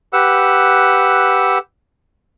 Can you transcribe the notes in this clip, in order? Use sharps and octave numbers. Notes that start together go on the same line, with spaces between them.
G4 B4 F#5 E6